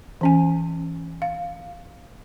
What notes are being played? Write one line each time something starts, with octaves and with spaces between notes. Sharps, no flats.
E3 C#4 G#5
F5